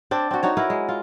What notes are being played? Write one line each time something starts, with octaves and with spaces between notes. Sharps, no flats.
C4 D4 D5
C4 F#4
D#4 F#4 C#5
E4 A#4 B4
G#3
F4